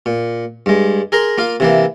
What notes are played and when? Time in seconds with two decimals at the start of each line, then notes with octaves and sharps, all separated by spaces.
0.06 A#2
0.66 G2 G#3
1.12 G#4 A#4 A#5 C6
1.38 A#3 F4 F5
1.60 C3 E3 A#3